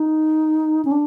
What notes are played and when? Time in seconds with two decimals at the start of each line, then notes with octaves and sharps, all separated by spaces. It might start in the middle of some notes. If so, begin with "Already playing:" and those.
Already playing: D#4
0.85 C#4
0.92 D4